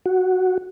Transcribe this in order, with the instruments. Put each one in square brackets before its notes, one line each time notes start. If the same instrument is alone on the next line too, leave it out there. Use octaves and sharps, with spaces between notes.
[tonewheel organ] F#4